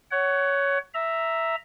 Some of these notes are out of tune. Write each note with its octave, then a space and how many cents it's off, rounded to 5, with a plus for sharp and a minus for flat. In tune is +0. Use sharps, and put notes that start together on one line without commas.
C#5 +10 F#5 +25
E5 +0 A#5 +0